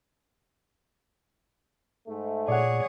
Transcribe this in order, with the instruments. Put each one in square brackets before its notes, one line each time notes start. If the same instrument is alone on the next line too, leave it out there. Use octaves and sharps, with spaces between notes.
[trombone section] G#2 A3
[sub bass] A#2 [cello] G#4 C#5 [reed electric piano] D5 F#5